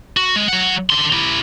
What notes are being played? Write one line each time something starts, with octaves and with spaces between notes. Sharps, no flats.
F#4
G#3
F#3 F#5
D3 C6
E4 G4